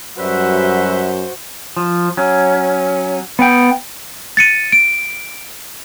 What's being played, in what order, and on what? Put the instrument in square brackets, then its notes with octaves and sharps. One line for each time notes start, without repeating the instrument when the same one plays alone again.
[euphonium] F#2 [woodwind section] G3 B4 E5 [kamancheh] F#4 C5
[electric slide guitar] F3
F#3 C#4
B3 F#5 G5
[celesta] A6 C#7 D#7
D7